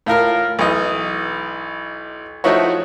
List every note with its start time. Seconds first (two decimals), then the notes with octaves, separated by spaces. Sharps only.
0.06 A2 F4 A#4 F6
0.59 B1 E3 D#5
2.44 F3 A3 D#4 E4 F#4 C#5